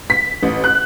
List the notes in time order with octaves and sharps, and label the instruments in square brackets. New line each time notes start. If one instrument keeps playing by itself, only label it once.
[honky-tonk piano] B6
A1
F#6